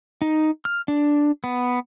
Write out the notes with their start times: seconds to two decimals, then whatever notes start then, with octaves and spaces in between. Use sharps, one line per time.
0.22 D#4
0.65 F6
0.88 D4
1.44 B3